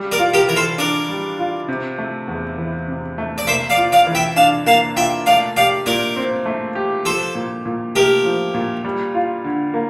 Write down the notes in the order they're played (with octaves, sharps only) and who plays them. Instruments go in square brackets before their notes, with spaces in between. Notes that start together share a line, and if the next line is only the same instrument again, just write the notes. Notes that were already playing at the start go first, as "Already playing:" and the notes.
Already playing: [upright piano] G3
[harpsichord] A#4 D5
[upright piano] F4
[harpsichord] G4 A#4
[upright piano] E3 [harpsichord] A#4
[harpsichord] A4 C5
[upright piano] D4 [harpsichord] A#4 D5
[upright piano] G3
F4
C3
A3
E2
E3
C3
A3
[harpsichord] D5
[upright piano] A#3 [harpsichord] C5 E5
[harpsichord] D5 F5
[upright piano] F4
[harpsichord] D5 F5
[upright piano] E3
[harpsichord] E5 G5
[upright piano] D4 [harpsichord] F5 A5
[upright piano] A#3 [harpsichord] F5 A5
[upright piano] F4 [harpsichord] E5 G5
[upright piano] A3 [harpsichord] D5 F5
[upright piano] G4 [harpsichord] D5 F5
[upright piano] A#2 [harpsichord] A#4 D5
[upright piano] C4
A3
G4
[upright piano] F3 [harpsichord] A4 C5
[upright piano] A#2
A#2
[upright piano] A3 [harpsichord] G4 A#4
[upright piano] F3
A#2
G3
F4
D3
A#3